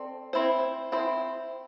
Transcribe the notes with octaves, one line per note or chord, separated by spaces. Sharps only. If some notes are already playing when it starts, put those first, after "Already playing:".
Already playing: C4 A4 D5
C4 E4 C5
C4 E4 C5